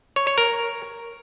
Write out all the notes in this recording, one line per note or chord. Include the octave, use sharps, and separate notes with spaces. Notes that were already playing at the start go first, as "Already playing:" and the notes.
C#5
C#5
A#4